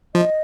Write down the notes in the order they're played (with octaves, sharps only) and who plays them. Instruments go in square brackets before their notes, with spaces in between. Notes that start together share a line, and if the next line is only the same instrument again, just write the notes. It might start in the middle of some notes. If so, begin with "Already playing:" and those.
[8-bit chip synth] F3 [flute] D#5